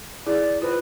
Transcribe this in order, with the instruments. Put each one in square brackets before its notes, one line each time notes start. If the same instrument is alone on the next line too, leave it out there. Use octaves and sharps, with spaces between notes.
[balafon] E4 G#4 [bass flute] D5
[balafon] F4 C5 [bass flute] B4